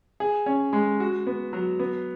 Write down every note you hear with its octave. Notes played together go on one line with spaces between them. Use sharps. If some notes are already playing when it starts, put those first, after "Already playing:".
G#4
C#4
G#3
F#4
B3
F#3
B3